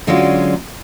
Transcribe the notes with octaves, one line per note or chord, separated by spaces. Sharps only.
D3 F#3 G#3 C#4 F4 D5